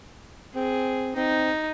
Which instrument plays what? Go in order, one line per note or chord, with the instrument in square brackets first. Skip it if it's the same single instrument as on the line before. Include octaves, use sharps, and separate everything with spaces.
[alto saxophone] C4 [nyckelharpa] G#4
[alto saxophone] C4 [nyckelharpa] D#4